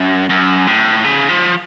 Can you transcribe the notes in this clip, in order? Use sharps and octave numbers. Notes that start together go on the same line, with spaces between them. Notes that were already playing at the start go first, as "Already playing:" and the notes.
Already playing: F#2
F#2
A2
C#3
F3